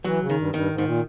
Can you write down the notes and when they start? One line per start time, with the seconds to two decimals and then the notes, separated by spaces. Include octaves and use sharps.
0.04 E3 F#3
0.21 C#3
0.30 D#3
0.38 G2
0.54 G2 D#3
0.70 G#2
0.78 D#3
0.86 A#2